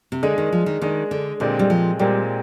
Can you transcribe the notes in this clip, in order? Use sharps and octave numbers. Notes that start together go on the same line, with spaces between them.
C3
D3 G#3 D4 G#4 D#5
D#3
F3
D#3
D#3 G#3 D4 G#4 D#5
D3
A#2 D3 G#3 C4 G4 D5
G3
F3
A#2 G3 G#3 C4 G4 D5